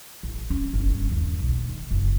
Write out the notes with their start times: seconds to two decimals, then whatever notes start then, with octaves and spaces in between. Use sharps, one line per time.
0.23 A1
0.50 C#4
0.73 G1
0.91 C#4
1.12 D#2
1.39 B1
1.53 D2
1.69 D#3
1.91 F#1